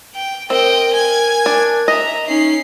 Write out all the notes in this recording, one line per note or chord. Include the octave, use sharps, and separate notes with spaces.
G5
C4 A#4 D#5 G5
G#5 G#6
D4
D#5 E5 A#5
C#4 D#4 C7